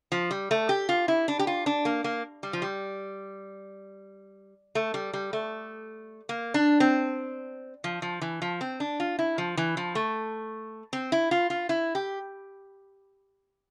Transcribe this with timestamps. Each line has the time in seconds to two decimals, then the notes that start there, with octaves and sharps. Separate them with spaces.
0.12 F3
0.31 G3
0.51 A3
0.69 G4
0.89 F4
1.08 E4
1.28 D4
1.39 G4
1.47 F4
1.66 D4
1.85 A#3
2.04 A#3
2.43 G3
2.53 F3
2.62 G3
4.75 A3
4.94 G3
5.13 G3
5.33 A3
6.29 A#3
6.54 D4
6.80 C4
7.84 F3
8.02 F3
8.21 E3
8.42 F3
8.61 C4
8.80 D4
9.00 F4
9.19 E4
9.38 F3
9.57 E3
9.77 F3
9.95 A3
10.93 C4
11.12 E4
11.31 F4
11.50 F4
11.69 E4
11.95 G4